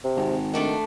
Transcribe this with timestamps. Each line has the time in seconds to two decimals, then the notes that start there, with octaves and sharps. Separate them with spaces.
0.04 C3
0.16 G#1
0.54 D#3 A3 D4 F#4